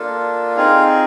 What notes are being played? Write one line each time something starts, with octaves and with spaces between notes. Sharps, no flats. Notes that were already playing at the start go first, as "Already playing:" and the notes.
Already playing: A#3 D4 F4 A4
C4 D#4 F4 G#4 F5